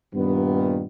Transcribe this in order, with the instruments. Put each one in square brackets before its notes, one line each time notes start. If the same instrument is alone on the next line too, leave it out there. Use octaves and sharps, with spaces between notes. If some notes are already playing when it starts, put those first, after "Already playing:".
[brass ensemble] G2 A#2 D#3 B3